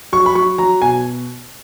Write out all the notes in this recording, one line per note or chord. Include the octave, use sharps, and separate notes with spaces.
F#3 C#6
B5
F#3 C#6
F#3 A#5
B2 G#5